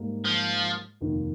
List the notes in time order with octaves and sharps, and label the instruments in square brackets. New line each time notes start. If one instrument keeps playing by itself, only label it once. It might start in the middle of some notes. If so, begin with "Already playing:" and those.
Already playing: [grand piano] G#2 G3 A#3
[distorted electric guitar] F3
[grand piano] F1 D#2 D#3